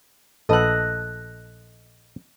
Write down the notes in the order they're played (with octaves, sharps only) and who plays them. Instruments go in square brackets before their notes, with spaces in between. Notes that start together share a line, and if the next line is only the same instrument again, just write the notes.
[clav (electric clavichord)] A#1 B4 F#5 [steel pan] A4 [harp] D#5 F#6